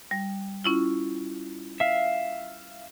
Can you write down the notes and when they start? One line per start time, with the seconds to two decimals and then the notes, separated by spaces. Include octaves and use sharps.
0.11 G3
0.64 C#4 E4 F4
1.80 E5 F5